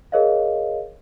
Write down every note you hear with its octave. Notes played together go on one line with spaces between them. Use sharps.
G#4 A#4 C#5 D#5 F5